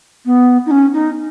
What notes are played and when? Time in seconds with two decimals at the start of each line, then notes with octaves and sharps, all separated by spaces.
0.26 B3
0.66 D#4
0.71 C#4
0.94 D#4